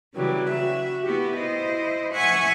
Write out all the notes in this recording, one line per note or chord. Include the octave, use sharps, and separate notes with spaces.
C#3 E3 F#3 G3
F#4 E5
B3 E4 F#4 G4
E4 C5 D#5
E5 F#5 G#5 C#6 F#6 G#6